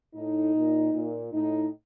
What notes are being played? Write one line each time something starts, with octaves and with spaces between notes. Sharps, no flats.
A2 D#4
A#2
A#2
A2 D#4